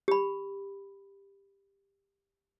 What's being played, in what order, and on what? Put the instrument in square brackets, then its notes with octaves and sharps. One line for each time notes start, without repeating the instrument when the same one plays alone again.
[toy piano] G4 B5